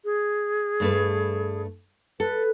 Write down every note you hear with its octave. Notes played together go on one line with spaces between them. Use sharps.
G#4
G2 A3 B4
A4 B4